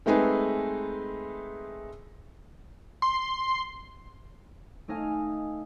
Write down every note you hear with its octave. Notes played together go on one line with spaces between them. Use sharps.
G#3 A3 C4 D#4 G#4 B4
C6
A3 C#4 D#4 D#5 F5 G#5